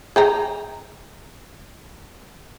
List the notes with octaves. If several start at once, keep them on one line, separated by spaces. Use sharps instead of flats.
G#4 G5 A#5